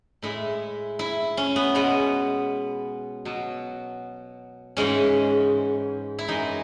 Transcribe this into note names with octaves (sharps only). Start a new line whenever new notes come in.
A2 G#3 E4
E4
C#4
B3
B2 G#3 B3
B2 F#3
G#2 E3 G#3 C#4
E4
F#2 E3 G#3 D#4